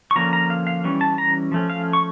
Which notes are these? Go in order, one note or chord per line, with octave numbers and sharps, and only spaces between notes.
C#6
D3 F3 A#3 C#4 A#5
A#5
F5
F5
E3 G3 C#4
A5
A#5
F3 A3 C#4
F5
C#6